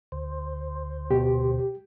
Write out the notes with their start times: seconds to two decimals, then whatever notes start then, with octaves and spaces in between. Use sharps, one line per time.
0.12 D2 C5
1.11 B2 G4